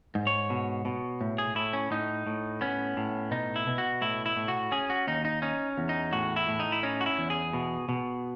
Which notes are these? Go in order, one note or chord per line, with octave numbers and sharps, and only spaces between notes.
G#2
C#5
B2
B2
A2
G#4
A2 E4
C#4
A2 D#4
A2
B3 C#4
A2
B2 D#4
E4
B2
F#4
A2 E4
E4
A2
F#4
C#4 G#4
F#4
D#2 D#4
D#4
C#4 D#4
E2
D#4
A2 F#4
E4
A2
D#4
E4
C#4 D#4
F#4
E4
E2
G#4
B2
B2